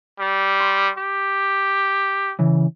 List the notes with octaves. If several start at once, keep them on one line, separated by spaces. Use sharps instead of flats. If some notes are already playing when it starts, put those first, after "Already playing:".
G3
C6
G4
C#3 E3